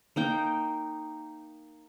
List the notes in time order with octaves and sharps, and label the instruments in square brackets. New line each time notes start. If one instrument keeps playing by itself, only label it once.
[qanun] A#3 D#4 G5